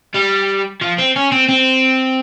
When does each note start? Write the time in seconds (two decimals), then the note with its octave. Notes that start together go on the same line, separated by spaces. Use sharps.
0.15 G3
0.82 F3
0.99 C4
1.16 C#4
1.32 C4
1.49 C4